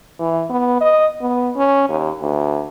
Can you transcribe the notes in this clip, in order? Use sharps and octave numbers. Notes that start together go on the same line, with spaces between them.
E3
B3
D#5
B3
C#4
D#2
D2